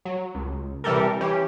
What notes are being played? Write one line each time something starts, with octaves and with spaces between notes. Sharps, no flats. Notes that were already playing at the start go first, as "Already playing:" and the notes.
F#3
C#2
C3 E3 G3 G4 A4 A#4
E3 C#4 G4